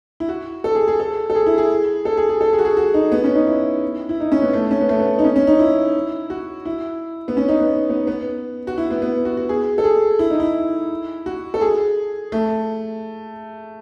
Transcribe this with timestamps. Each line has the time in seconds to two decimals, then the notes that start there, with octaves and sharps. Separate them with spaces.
0.20 E4
0.29 F#4
0.64 A4
0.75 G#4
0.88 G#4
1.00 A4
1.30 A4
1.35 G#4
1.46 E4
1.58 G#4
2.05 A4
2.17 G#4
2.29 G#4
2.41 A4
2.53 G#4
2.59 F#4
2.65 G#4
2.77 F#4
2.94 D#4
3.12 B3
3.24 C#4
3.35 D#4
3.47 E4
4.09 E4
4.20 D#4
4.32 C#4
4.42 B3
4.53 A3
4.71 C#4
4.80 B3
4.89 A3
4.99 B3
5.19 D#4
5.24 C#4
5.36 C#4
5.47 D#4
5.59 E4
6.30 F#4
6.65 E4
7.28 B3
7.37 C#4
7.48 D#4
7.60 B3
7.90 B3
8.07 B3
8.67 F#4
8.78 E4
8.90 B3
9.02 B3
9.25 F#4
9.37 F#4
9.49 G#4
9.78 A4
9.84 G#4
10.19 E4
10.30 D#4
10.40 E4
11.26 F#4
11.54 A4
11.61 G#4
12.32 A3